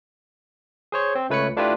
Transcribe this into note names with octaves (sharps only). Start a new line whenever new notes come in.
G#4 C5 C#5
C4
C#2 A3 B4 C#5 B5 C#7
A3 D4 E4 F4 G4 B4